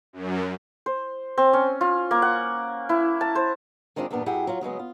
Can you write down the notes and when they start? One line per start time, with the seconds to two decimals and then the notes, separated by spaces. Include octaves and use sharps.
0.13 F#2
0.86 C5
1.38 C4
1.53 C#4
1.81 F4
2.11 A#3
2.22 F#5
2.89 E4
3.21 A5
3.35 C5
3.96 D#3 G#3 C4 D4 D#4 F4
4.11 E2 G2 A#2 B3 D4
4.26 F#2 E4 G4 G#4 F#5 G5
4.47 F#3 F4
4.61 C#3 F#3 G#3 B3
4.79 F4